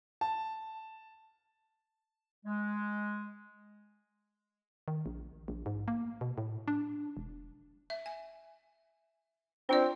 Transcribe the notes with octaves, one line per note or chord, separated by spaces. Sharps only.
A5
G#3
D#3
A#1
A#1
G#2
A#3
B2
A2
D4
E1
E5
G#5
C4 D4 F4 D5